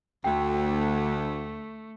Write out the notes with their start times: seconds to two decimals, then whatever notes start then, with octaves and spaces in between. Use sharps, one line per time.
0.24 D2 A3 G5